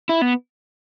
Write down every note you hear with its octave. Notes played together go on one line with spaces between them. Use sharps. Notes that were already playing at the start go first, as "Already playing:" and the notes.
E4
B3